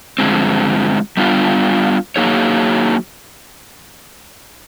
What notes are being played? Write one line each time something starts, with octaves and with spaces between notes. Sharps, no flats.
G2 D3 F3 G#3 C4
G3 B3 D4 F4
F#3 A#3 D#4 G#4 C#5